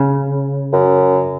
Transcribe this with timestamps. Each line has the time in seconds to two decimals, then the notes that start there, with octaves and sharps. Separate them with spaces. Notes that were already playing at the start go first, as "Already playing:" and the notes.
Already playing: C#3
0.73 F#2